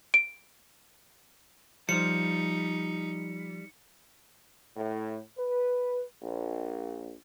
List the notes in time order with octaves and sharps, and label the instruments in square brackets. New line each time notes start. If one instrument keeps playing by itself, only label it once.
[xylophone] D7
[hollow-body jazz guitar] F3 [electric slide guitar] G3 [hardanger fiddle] D#4 [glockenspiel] C#7
[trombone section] A2
B4
A#1